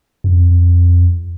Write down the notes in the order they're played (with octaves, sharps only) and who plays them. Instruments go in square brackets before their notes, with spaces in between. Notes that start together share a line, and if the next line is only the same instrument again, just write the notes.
[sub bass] F2